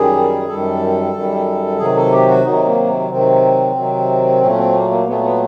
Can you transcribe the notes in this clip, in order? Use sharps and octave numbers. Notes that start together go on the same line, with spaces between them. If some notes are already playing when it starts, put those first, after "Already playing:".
Already playing: F#2 D#3 G3 G#4
F#2 D#3 G3 A4
F#2 D#3 G3
C3 D#3 F#3 G#4
A4
G4
F#4
C3 D#3 F#3 D#4
A#3
C3 D#3 F#3 C4
C3 D#3 F#3
A#2 F#3 A3 C#4
C4
A#3
A#3
A#2 F#3 A3 B3
B3